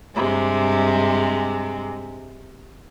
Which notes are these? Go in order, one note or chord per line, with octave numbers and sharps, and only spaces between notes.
G2 C3 G#3